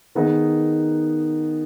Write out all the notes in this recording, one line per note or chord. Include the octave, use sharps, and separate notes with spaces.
D#3 B3 D#4 G#4